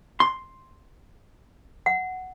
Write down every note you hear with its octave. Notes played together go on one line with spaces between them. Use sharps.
C6
F#5